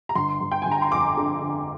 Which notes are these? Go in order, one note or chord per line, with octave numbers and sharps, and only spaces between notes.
A#5
G1 C6
G1
G5
G1 G#5
A#5
C6
F2 D6
D3
D3